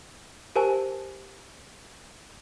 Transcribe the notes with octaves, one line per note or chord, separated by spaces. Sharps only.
G4 A#4 C5 G#5 A5